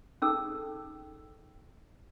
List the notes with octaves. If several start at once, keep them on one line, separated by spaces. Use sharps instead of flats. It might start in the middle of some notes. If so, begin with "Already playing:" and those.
C#4 D#4 G#4 A4 E6